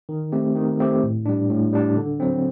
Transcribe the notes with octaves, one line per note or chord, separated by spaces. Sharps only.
D#3
A3 C4 G4
D#3
A3 C4 G4
A2
G3 D4
A2
G3 D4
D3
F#3 C4